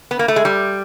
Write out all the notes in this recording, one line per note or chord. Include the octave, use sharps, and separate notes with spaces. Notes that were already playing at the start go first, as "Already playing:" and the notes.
B3
A#3
A3
G#3
G3